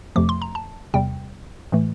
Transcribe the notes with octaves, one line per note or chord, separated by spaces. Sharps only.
F2 C3 F3 A3 D6
C6
A#5
A5
E2 C3 G3 G5
A2 E3 A3